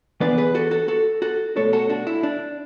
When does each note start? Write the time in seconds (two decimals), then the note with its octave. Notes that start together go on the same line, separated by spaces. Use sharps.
0.20 E3 B3 D4 B4 D5
0.38 G#4 B4
0.55 F#4 A4
0.71 F#4 A4
0.88 F#4 A4
1.22 F#4 A4
1.56 B2 A3 D4 A4 C#5
1.73 F#4 A4
1.89 D4 F#4
2.07 E4
2.23 D4